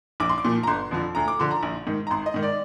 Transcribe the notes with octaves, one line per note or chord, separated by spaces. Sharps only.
A#1 D6
C6
D6
A#2 F3
A#5
G1 C6
F2 D3 F3
D2 A#5
D6
D3 F3 C6
A#5
A#1
G#2 D#3
A#5
G#1 C6
D#5
G#2 D#3
D5